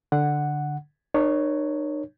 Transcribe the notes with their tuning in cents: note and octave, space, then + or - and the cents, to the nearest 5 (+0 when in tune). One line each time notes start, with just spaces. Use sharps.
D3 +0 F#5 +0
D#4 -45 A#4 +35 C#5 +0